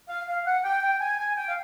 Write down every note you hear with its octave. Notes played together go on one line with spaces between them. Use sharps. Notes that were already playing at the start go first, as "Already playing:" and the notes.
F5
F5
F#5
G5
G5
G#5
G#5
G5
F5